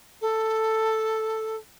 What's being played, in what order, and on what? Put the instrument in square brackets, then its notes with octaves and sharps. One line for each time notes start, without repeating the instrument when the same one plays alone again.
[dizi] A4